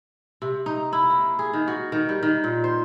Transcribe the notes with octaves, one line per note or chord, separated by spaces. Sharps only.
C3
D#4
E4
A#3
G#4
D#3
F#4
D#3
G3
D#3
A#2
C5